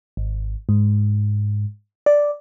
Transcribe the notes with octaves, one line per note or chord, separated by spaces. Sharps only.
G#1
G#2
D5